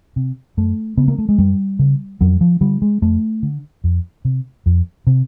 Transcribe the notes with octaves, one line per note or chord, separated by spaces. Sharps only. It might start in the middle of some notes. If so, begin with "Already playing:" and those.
C3
F#2 A3
C#3 B3
A#3
A3
G#3
F#2 G3
C#3
F2 F#3
F3
D3 G3
G#3
F2 A3
D3
F2
C3
F2
C3